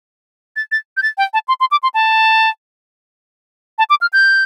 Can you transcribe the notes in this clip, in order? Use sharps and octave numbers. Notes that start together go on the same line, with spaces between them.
A6
A6
G6
A6
G5
A5
C6
C6
D6
C6
A5
A5
D6
F6
G6